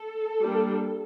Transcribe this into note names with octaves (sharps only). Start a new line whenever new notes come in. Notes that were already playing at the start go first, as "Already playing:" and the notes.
Already playing: A4
G3 A#3 D4